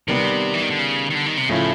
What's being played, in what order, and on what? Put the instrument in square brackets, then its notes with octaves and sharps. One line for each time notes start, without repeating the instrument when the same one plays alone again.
[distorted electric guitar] C3 [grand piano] D#3 G3 B3
[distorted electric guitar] E3
D#3
D3
C#3
D#3
D3
D#3
C3
[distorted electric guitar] A2 [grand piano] C#3 F3 A3 C#4 E4